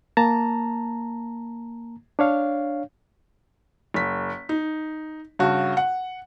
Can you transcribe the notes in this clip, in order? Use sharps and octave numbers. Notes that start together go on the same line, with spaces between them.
A#3 A5 A#5
D4 C#5 F5
F#1 B6
D#4
G2 C#3 F#4
F#5